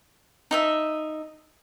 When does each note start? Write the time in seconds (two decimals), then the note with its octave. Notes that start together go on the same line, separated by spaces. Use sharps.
0.51 D#4 D#5 E5